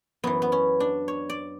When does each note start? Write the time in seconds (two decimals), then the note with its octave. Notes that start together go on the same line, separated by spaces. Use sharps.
0.24 F#2 E3 B3
0.42 B3
0.52 C#4
0.80 D4
1.08 C#5
1.30 D5